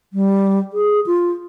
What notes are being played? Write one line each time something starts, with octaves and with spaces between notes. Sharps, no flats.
G3
G#4
F4